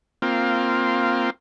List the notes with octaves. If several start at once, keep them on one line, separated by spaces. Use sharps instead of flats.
A#3 C4 F4